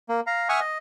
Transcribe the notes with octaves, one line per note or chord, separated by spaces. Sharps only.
A#3
F5 A#5
E5 F#5 G#5 C#6 D#6 F6
D#5